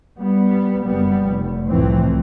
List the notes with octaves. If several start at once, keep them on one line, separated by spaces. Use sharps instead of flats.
G3 B3
F#1 G3 B3
F1
C2 F2 A2 E3 C4